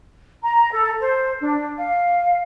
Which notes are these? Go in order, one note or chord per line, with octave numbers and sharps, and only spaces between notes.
A#5
A4
C5
D4
F5